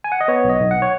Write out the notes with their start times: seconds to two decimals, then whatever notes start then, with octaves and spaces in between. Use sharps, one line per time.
0.04 G#5
0.12 F#5
0.21 D#5
0.28 B3 C#5
0.44 B1
0.49 D#5
0.60 B1
0.71 F#5
0.82 C#5